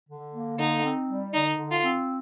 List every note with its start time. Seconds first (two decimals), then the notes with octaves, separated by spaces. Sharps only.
0.08 D3
0.33 A#3
0.58 D3 D#4
0.84 C4
1.08 G3
1.33 D3 D#4
1.57 D3
1.71 F4
1.82 C4